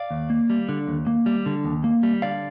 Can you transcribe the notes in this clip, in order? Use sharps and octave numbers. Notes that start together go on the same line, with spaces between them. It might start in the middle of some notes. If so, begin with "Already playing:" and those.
Already playing: D5 F5
D#2
A#3
G3
D3
D#2
A#3
G3
D3
D#2
A#3
G3
D3 D5 F5